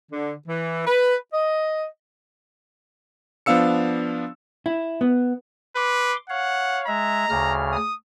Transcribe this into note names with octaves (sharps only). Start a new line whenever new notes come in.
D3
E3
B4
D#5
F3 B3 D4 F5 E6 C#7
E4
B3
B4 C6 D6
C#5 F5 F#5
G#3 E5 A#5
D2 C#3 F6
D#6